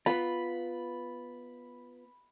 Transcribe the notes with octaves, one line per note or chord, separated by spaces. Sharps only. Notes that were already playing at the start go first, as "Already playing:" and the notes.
B3 F4 B5